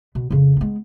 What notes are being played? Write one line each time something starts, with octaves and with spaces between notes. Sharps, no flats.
B2
F2 C#3
G#3 B3